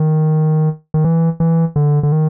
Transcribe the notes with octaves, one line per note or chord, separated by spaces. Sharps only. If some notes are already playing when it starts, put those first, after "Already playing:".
Already playing: D#3
D#3
E3
E3
D3
D3
D#3